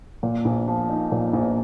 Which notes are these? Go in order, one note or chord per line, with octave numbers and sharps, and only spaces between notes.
A#2
A#1
F3
D#4
A#2
A#1